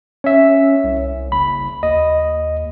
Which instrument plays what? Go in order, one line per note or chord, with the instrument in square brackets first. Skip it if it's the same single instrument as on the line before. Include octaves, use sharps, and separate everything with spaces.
[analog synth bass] C#4 [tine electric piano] C#5 E5
[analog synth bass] C2
[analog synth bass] F#1 [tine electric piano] B5
[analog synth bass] D#2 [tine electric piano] D#5